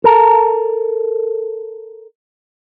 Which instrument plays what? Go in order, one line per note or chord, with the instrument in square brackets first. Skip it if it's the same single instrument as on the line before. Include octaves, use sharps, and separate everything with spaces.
[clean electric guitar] A4 A#4